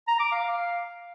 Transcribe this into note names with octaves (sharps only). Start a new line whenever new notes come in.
A#5
D6
F5
F5